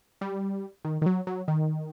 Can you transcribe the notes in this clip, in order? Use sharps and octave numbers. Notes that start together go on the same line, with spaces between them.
G3
D#3
D#3
F#3
F#3
D#3